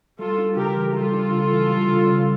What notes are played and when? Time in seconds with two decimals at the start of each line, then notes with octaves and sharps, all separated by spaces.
0.19 G3 F4 A4
0.38 D4
0.56 C#3 G4 A#4
0.76 E3
0.94 G3 F4 A4
1.13 D4
1.31 C#3
1.51 E3
1.70 G3
1.88 C#3
2.07 C#3